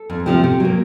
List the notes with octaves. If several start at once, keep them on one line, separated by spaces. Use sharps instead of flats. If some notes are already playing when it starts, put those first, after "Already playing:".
Already playing: A4
F2
C3 F3 A3
C3
F#3 A#3